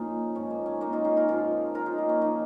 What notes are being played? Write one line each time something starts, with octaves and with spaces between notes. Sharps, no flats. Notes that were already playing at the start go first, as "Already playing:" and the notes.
Already playing: A#2 F3 C#4 D#4 F4 G#4
G#2 F3 C#4
A#3
C#4
A#3 D#4
C#4 F4
D#4 G#4
F4 A#4
G#2 F3 F4 A#4
F4 A#4
D#4 G#4
A#3
C#4
A#2 F3 A#3 D#4